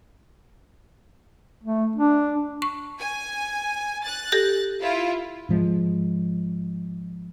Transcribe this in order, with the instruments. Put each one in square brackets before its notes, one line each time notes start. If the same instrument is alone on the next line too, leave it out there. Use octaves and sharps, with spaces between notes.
[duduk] A3
D4
[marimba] C#6
[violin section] G#5
F#6 A6
[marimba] G4 A4 A#6
[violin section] E4 F4
[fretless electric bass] G#2 F3 G#3